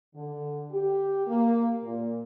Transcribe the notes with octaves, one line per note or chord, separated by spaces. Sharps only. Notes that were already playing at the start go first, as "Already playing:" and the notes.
D3
G4
A#3
A#2